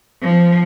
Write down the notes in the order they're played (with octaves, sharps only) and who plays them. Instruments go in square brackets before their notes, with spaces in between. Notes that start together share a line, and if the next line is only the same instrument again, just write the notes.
[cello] F3